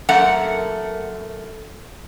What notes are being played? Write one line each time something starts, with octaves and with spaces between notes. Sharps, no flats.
F#2 A3 A#3 F#5